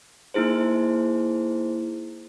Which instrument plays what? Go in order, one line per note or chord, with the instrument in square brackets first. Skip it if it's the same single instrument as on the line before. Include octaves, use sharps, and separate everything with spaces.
[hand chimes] A#3 D#4 E4 G#4 C5